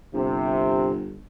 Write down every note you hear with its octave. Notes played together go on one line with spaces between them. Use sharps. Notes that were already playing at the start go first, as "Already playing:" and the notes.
G1 C3